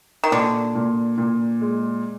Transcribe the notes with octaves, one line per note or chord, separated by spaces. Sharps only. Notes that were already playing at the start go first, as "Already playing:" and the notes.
D#3
A#2 D3
A#2
A#2
G#3